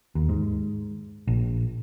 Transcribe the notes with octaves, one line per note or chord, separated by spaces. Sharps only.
D#2
G#2
A#1